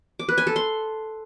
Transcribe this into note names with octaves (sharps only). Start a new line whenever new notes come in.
D6
B4
G#5
A4
C6